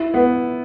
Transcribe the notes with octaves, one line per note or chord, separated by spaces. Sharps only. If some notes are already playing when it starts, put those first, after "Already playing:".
Already playing: E4
B3